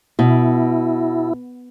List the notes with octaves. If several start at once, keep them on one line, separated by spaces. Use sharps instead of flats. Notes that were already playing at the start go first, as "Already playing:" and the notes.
B2 E4